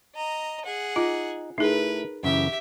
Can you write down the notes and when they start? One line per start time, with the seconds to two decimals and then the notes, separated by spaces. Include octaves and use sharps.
0.15 D#5 A#5
0.65 G#4 F#5
0.96 D#4 F4
1.58 A3 D#4 E4 G#4 A#4 B4
2.23 F#2 C#3 E3 G4 E5